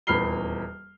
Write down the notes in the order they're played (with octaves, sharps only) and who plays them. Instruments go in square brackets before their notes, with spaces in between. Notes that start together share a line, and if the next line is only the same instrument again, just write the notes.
[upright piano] D#1 E2 B5 F6 C7 G7